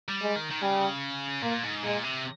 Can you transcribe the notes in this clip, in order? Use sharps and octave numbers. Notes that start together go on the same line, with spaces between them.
G3
G#3
D#3
D#3
C#3 G3
A#2 A#3
G#2
A#2 G#3
C3